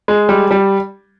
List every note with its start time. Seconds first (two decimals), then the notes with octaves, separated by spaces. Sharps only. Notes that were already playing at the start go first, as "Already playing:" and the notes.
0.08 G#3
0.29 G3
0.51 G3